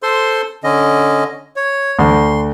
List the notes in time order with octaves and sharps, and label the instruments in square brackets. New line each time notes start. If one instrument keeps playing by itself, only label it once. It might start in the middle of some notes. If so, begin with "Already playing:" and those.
[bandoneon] A4 C5 C6
D3 C#4 D#5
C#5
[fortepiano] D2 [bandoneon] C6